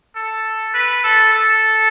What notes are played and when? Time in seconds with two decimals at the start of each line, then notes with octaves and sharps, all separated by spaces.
0.15 A4
0.74 B4
1.04 A4
1.33 A4